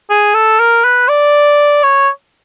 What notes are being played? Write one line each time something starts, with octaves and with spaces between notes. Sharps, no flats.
G#4
A4
A#4
B4
D5
C#5